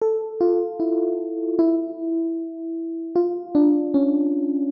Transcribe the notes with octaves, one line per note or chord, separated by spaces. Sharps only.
A4
F4
E4
E4
F4
D4
C#4